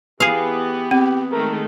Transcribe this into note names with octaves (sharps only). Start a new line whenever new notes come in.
E3 B3 G4 G#4 F5
C4 G4
D#3 G#3 A3 A#4